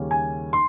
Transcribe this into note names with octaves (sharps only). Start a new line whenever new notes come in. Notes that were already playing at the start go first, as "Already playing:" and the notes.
Already playing: D#2 C#3 G3 A#3 C#4
G#5
C6